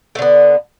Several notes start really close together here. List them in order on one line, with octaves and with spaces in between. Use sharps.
A3 D3 B3